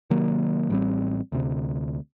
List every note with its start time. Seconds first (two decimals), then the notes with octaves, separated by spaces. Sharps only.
0.10 C3 D#3 F#3 A#3
0.70 A1 G3 C4
1.32 D2 C3